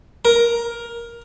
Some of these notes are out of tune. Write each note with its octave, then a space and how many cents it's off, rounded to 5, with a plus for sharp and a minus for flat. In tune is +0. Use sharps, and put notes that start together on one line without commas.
A#4 +10